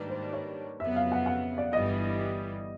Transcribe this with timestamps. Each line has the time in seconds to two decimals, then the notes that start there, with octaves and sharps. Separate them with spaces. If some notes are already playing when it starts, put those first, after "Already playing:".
Already playing: G#2 D#3 G3 A#3 D4 B4
0.10 C5
0.33 C#5
0.80 F2 C#3 F#3 B3 E5
0.96 F5
1.12 F#5
1.26 F#5
1.58 D5
1.73 G1 G2 E3 G3 B3 D#5